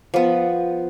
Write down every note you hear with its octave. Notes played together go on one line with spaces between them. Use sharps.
F3 B3